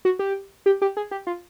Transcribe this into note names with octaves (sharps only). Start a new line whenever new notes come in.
F#4
G4
G4
G4
G#4
G4
F4